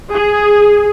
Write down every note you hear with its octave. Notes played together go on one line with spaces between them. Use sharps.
G#4